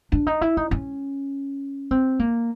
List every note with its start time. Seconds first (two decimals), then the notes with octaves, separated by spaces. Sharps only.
0.12 D4
0.27 D#4
0.41 E4
0.57 D#4
0.71 C#4
1.91 C4
2.19 A#3